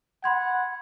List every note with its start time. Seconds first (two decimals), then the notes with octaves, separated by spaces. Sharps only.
0.24 F#5 B5 C6 G#6